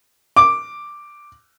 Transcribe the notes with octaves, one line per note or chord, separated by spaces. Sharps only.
D6